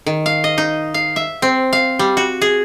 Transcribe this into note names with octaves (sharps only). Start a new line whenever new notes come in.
D#3
F5
D#5
D#4
F5
E5
C4
F5
G3
F#4
G#4